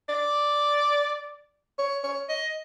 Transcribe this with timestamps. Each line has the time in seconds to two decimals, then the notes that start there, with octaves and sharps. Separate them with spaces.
0.09 D5
1.79 C#5
2.04 C#5
2.29 D#5